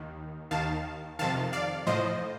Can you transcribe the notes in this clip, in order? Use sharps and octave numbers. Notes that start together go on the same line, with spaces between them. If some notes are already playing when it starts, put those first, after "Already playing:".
Already playing: D#2 D#3
D#2 D#3 F5 A5
F2 C3 D#3 F5 A5
D5 F5
A2 F3 C5 D#5